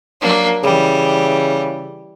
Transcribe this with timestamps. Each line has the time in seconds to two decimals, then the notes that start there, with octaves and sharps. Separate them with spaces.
0.21 F#3 A#3 D4
0.64 C#3 E3 G3